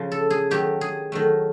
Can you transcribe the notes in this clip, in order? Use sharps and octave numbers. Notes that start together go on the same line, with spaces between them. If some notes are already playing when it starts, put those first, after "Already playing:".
Already playing: C#3 F3
A4
G#4
D#3 F#3 A3 G4
G#4
D#3 F#3 A3